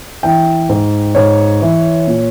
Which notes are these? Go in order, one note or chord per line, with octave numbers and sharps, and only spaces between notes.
E3 G5
G#2
G#2 C#5
E3
A#2